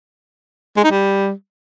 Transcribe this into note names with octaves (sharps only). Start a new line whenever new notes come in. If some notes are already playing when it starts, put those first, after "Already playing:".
G#3
D#4
G3